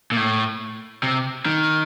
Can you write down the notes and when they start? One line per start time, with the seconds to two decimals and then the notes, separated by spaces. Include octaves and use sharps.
0.12 A#2
0.17 A2
1.03 C3
1.46 D#3